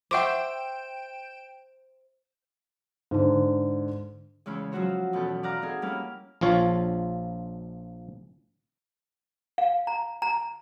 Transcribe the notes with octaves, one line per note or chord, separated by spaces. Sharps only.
C5 E5 F#5 G5 C#6 D6 D7 E7
G#2 D3
E2 C#3 G#3 C#4 E4
F3 F#3 C#4 F#4 C5 C#5
E2 B2 C#4 A4 F#6
D5 F5 F#5 A#5
C4 D#4 E4 G#4 A4
G3 A#3 C#4 E4 F5
A#1 F3 F4 C#5
F5
A#5
A#5